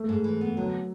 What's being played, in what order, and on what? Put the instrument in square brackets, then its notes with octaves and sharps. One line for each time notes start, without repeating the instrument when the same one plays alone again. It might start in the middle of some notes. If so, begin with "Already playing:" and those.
Already playing: [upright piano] A3
[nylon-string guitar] G#2
E3
B3
[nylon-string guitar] D3 [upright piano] F#3